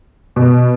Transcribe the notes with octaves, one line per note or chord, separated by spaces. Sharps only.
B2